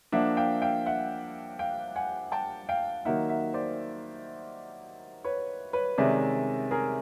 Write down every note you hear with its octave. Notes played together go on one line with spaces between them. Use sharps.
F3 A#3 D4 E5 F#5
F5 G5
F5 G5
E5 F#5
F5 G5
F#5 G#5
G5 A5
F5 G5
D#3 F#3 A#3 D#4 E5 F#5
E5 F#5
C5 D5
B4 C#5
B4 C#5
C3 D#3 G#3 C#4 D5 E5
G#4 A#4